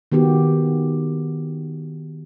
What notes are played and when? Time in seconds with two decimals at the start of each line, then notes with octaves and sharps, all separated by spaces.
0.12 D#3 B3 F#4 G4